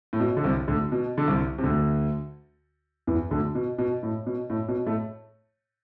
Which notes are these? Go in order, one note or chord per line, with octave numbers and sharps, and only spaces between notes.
A2
B2
D3
C2 C3
D2 D3
B2
D3
C2 C3
C3
D2 D3
E2 E3
D2 D3
B2
B2
A2
B2
A2
B2
A2 A3